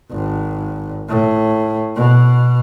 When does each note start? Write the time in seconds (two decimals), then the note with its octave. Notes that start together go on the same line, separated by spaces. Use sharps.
0.11 G#1
1.09 A2
1.96 B2